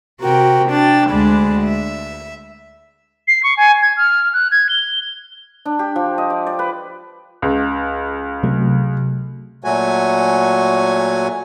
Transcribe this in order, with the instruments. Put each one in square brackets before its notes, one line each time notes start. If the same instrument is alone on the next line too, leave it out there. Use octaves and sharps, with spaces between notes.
[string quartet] C3 F#4 A#4 G5
D4 G5 A6
D2 G#3 D4 B5
E5
[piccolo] C7
C#6
G#5
G#6
F6
F#6
G#6
G7
[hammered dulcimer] D4
G4
F3
D#5
D5
D5
B4
[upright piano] C#2
[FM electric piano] C3 F#3 A3
[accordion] A#2 F#3 A3 F#4 G#5